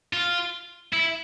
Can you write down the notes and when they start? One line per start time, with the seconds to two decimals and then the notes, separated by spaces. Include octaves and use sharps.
0.13 F4
0.93 E4